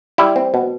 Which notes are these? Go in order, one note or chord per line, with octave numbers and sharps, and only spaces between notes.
G3 E4
C4
B2